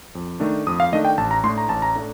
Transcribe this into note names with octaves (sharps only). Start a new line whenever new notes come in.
F2
D#3 A3 D4
F2 D#6
F5
D#3 A3 D4 D#5
G5
A1 A5
A#5
A2 A3 D4 C6
A#5
A1 A5
A#5
A2 A3 D4